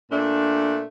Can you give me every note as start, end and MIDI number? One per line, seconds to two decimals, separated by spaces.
0.11 0.84 46
0.11 0.84 57
0.11 0.84 62